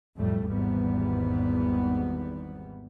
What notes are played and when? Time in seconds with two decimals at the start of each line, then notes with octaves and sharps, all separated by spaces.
0.17 B1 F2 A2 G3 A3
0.46 G#1 E2 G#2 G3 B3